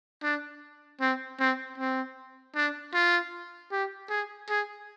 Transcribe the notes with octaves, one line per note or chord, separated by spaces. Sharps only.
D4
C4
C4
C4
D4
F4
G4
G#4
G#4